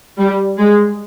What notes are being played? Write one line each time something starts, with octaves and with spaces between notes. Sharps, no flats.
G3
G#3